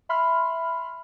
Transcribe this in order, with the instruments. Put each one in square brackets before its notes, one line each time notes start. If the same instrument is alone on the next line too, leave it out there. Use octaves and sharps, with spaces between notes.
[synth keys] E5 B5 C6 F6